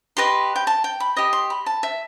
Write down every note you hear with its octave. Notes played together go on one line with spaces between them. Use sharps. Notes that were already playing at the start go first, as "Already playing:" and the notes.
G4 B4 D#5 C6
G5
A5
G5
B5
G4 D#5 D#6
C6
B5
A5
E5